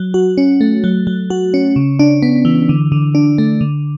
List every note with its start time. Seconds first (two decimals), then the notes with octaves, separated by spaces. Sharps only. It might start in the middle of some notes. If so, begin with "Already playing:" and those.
Already playing: F#3
0.14 F#4
0.38 C#4
0.61 A3
0.84 F#3
1.07 F#3
1.30 F#4
1.54 C#4
1.76 C#3
1.99 D4
2.22 B3
2.45 E3
2.69 D3
2.92 D3
3.15 D4
3.38 A3
3.61 D3